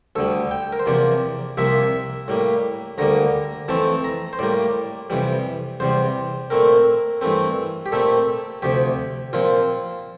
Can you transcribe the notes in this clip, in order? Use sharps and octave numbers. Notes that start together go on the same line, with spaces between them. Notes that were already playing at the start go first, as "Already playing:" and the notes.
D2 D3 G3 A4
G5
A#4
C5
E2 C3 F3 A#3 D5
C2 C3 F3 A#3 E5
A2 G3 A#3
D2 D3 G3 A#3 A#5
F2 E3 A3 C4 A5
A#5
C5
A2 G3 A#3 D5
F2 C3 E3 G3
E2 C3 G3 C5
A#2 A3 C4 A#4
G2 E3 A3 C4
G4
A#2 A3 C4 A4
D2 C3 F3 G4
A#2 F3 C4 F4